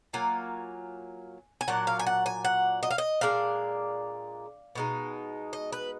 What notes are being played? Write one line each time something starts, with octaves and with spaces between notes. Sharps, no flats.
F#3 A#3 F4 G#5
G#5
A#2 F#3 D4 F#5
F5
G#5
F#5
G#5
F#5
D#5
F5
D#5
A#2 G#3 D4 F5
B2 G#3 D#4
D#5
B4